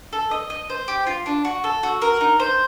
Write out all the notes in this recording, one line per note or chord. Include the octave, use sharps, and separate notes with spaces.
A4
D#5
D#5
C5
G4
F4
D4
F#4
A4
F#4
A#4
D#4
C5